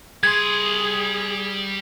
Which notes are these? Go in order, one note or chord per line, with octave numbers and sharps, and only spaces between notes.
G3 G#4 C6 G#6